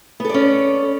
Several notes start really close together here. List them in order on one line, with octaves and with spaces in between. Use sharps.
B3 A4 D5 C#4